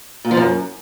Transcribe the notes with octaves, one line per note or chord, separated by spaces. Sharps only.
A#2
F3
F#2